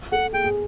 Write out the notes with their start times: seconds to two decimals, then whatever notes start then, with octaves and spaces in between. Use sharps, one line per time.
0.12 A4 F#5
0.33 G#4 G5
0.44 G#4